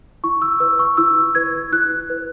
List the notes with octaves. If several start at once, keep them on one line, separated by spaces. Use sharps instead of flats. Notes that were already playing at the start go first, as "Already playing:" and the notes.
E4 C#6
E6
B4 E6
C#6
E4 E6
B4 G#6
E4 F#6
B4